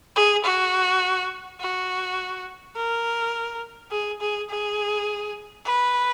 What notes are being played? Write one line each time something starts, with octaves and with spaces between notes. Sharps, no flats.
G#4
F#4
F#4
A#4
G#4
G#4
G#4
B4